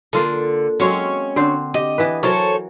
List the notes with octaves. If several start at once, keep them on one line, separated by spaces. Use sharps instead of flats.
D3 A#3 F4 A4
F#3 G#3 C4 C#4 C#5
D3 C4 C5
G4 D#5
E3 B3 B4
E3 F#3 A4 A#4 C5 C#5